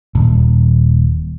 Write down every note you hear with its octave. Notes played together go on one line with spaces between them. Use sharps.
D#1